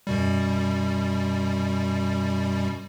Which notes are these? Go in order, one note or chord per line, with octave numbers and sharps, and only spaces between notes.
F#2 B2 G3